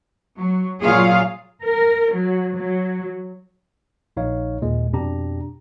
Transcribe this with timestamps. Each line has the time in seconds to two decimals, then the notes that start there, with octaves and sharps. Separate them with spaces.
0.37 F#3
0.83 A#2 F#3 F4 G#4 C#5 F5
1.62 A#4
2.12 F#3
2.55 F#3
4.17 A#1 D#4 C#5 F5
4.62 D#2 A#2 G#3
4.93 F2 B2 D4 G4 A#5